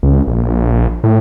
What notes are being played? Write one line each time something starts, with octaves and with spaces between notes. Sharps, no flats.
C#2
A#1
A2